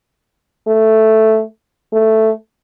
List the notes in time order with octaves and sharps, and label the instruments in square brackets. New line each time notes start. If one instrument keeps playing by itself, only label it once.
[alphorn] A3
A3